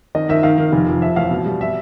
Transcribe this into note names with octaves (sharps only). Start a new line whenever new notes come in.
D#3 D#5
D#3 E5
D#3 F5
D#3
F1
F2
F3 E5
A1 F5
B2
G3
E5